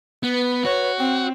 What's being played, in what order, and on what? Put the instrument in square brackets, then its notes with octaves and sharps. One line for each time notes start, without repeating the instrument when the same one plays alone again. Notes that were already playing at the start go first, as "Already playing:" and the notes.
[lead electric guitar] B3 [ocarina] B4
[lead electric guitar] F#4 [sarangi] C#5
[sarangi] C4 [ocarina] G5